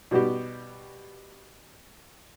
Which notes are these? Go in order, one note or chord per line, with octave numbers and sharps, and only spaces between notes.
B2 G3 B3 F#4 G4